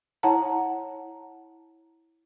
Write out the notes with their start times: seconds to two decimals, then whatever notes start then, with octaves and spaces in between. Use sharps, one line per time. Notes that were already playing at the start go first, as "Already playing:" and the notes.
0.23 E4 C#5 F#5 A5 A#5